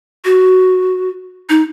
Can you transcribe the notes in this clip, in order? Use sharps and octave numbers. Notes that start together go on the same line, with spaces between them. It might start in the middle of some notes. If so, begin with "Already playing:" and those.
F#4
D#4